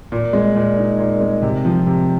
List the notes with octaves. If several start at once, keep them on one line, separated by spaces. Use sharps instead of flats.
A#2
G#3
A#2
D#4
A#2
G#3
C3
F3
C3